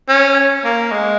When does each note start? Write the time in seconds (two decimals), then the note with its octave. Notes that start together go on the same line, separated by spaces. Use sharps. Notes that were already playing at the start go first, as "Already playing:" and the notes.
0.09 C#4
0.64 A#3
0.92 G#3